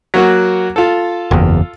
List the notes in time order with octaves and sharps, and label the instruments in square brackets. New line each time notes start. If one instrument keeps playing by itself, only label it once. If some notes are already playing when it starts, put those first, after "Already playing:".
[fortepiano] F#3 A#3 F#4
F4 A4
[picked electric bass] F#1 E2